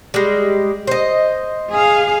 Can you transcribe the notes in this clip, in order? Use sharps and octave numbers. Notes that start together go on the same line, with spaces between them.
G3 G#3
C5 D#5
G#4 F5